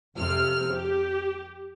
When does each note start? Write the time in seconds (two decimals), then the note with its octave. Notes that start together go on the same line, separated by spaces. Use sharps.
0.16 F2 C3 F6
0.75 G4